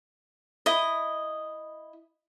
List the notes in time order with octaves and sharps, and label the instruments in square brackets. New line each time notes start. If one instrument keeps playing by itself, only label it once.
[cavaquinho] E4 D#5